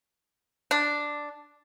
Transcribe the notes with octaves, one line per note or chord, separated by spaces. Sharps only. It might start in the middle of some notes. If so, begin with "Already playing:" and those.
D4